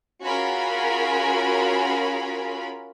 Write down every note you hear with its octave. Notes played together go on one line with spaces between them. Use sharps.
C#4 F4 F#4 G#4 A#4 B5